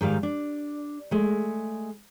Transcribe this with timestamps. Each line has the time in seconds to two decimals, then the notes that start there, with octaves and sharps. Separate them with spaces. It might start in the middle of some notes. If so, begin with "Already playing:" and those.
0.01 G#2 D#3 G3 F5
0.23 D4
1.11 G#3 A3